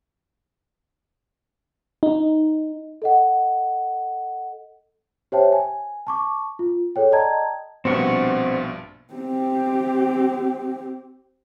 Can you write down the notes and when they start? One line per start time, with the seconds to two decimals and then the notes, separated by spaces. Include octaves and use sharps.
2.03 D#4
3.02 A4 D#5 F#5
5.32 G4 C5 C#5 E5 G5 A5
5.52 G#5
6.07 A5 C#6 D6
6.59 F4
6.96 G#4 A4 C#5 G5
7.12 D5 D#5 G5 A5 A#5 G#6
7.85 A#1 G2 B2 C4 F#5 C#6
9.14 C4 G4